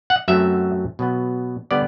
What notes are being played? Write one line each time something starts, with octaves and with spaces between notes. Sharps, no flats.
F#5
F#2 F#3 A3 C4 E5
B2 F#3 B3
D3 G3 B3 D5